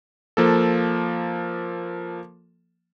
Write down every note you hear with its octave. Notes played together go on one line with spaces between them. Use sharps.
F3 A#3 A4